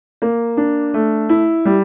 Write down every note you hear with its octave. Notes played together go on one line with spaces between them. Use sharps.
A#3
D4
A3
E4
G3